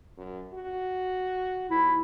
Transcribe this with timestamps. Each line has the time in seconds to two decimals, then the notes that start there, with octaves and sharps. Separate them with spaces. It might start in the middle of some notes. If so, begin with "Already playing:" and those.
0.18 F#2
0.54 F#4
1.71 D#2 E4